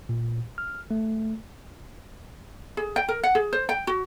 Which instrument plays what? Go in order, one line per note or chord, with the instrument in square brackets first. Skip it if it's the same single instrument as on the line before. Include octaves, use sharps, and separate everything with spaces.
[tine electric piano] A#2
F6
A3
[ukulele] G#4
G5
A#4
F#5
G#4
C5
G5
F#4